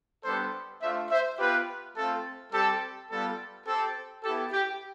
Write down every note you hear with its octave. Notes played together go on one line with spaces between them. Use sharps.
G3 B3 D4 G4 A4 C5
A3 D4 F4 C5 E5
C5 E5
B3 F4 G4 B4
A3 C4 F4 A4
G3 C4 G4 A4
G3 B3 F4 A4
C4 G4 A4
B3 E4 G4 A4
G4